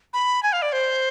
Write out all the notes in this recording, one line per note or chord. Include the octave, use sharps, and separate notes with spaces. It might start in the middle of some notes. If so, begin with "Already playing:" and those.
B5
G#5
F5
D5
C5